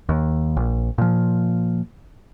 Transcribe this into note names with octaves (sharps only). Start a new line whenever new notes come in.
D#2
A#1
A#2 F3